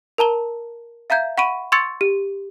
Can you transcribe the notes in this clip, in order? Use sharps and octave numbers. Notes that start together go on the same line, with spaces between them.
A#4 A5 A#5 G7
E5 F5 A#5 G6 G#6
F#5 B5 C#6 D7 D#7
C6 C#6 E6 G#6 A6 C#7
G4